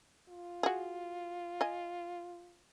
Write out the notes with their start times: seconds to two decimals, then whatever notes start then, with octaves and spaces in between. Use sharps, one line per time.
0.28 F4
0.63 F#4 G#4
1.61 D#5 G#5